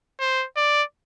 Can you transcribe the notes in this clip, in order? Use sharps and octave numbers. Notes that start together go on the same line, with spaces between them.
C5
D5